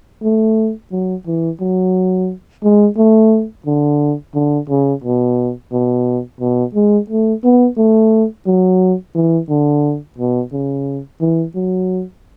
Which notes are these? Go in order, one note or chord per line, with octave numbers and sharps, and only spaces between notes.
A3
F#3
E3
F#3
G#3
A3
D3
D3
C#3
B2
B2
B2
G#3
A3
B3
A3
F#3
E3
D3
B2
C#3
E3
F#3